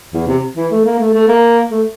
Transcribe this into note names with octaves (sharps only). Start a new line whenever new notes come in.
E2
C3
E3
A3
A#3
A3
A3
A#3
A3